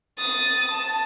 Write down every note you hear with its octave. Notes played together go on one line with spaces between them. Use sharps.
D#6 A6
A5